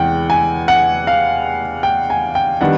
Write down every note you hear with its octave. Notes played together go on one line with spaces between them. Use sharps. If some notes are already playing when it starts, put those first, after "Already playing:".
Already playing: E2 C3 E3 G#3 F#5 G5
G#5
F#5
F5
G5
G#5
G5
D#3 G3 B3 D4 F#5